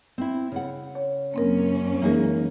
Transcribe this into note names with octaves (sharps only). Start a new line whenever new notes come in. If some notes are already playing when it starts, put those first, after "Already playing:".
C4 E4
C#3 F#5
C#5
F#2 A#3 C4 C#4 A#4
E3 G#3 A#3 D#4 G#4 A#4